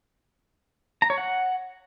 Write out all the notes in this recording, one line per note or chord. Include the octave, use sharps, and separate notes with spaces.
A#5
C#5
F#5